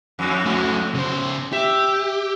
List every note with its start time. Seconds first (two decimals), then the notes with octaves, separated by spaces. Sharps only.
0.19 F2 A2
0.46 A3 F#4
0.95 C#3 C5
1.52 G4 E5